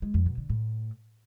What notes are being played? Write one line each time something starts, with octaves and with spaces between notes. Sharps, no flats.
G#3
F2
B2
D3
A2